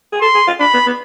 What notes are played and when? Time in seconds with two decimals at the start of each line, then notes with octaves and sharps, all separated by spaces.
0.13 G#4
0.21 A4 C6
0.35 G#4
0.47 F4
0.60 D4 B5
0.74 B3
0.86 B3